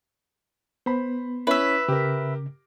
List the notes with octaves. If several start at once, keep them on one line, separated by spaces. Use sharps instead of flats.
B3 C5 B5
C#4 E4 B4 E5
C#3 G4 A#4